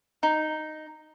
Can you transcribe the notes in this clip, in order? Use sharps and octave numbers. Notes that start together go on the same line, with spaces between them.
D#4